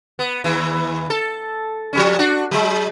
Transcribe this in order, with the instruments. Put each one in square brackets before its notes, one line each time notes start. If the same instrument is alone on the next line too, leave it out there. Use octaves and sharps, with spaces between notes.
[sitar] B3
D#2 E3
A4
F3 G3 C#4
D4 F#4
F#3 G#3